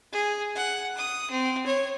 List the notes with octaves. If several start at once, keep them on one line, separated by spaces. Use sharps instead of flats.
G#4
F#5
D#6
C4
C#5